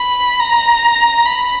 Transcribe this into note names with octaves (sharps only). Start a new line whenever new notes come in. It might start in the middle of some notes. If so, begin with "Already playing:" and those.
Already playing: B5
A#5
B5